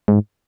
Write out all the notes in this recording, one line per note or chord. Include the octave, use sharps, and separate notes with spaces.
G#2